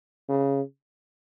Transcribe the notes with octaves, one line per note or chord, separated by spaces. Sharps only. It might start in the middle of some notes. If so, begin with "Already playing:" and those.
C#3